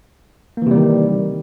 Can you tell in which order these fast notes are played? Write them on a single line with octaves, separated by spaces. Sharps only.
A#3 E3 C3 G3 D#3